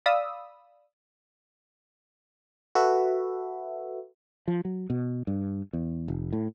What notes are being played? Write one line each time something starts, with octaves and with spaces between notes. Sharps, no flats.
D5 F5 B5 D#6 E6
F#4 A4 B4 E5
F3
F#3
B2
G2
E2
F1
A2